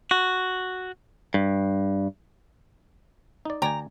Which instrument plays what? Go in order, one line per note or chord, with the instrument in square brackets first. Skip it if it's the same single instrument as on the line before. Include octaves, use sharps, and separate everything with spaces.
[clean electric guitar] F#4
G2
[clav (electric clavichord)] D#4 D5
[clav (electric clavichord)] D2 D5 G#5 [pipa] G5 A#5